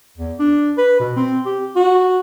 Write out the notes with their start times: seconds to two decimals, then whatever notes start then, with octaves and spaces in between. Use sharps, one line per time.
0.17 E2
0.39 D4
0.78 B4
0.99 B2
1.16 C4
1.46 G4
1.76 F#4